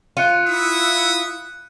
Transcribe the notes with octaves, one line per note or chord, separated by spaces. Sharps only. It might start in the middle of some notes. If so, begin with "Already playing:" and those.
F4 F#6 C#7 D#7
E4 E5 F#5 D#6